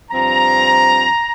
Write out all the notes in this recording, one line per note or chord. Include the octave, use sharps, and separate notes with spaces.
G2 F3 C4 A#5